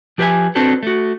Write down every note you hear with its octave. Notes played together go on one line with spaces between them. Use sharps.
F3 G4 B4 C5 E5 G#5
C4 D4 F#4 A4 B4 C5
A3 F#4